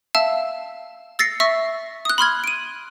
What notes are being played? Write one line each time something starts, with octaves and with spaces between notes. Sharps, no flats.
E5 F5 A5 E6
E6 A6 A#6 C7 C#7
E5 C#6 E6 A#6
D#6 F#6
B5 C6 F6 G#6
D7 D#7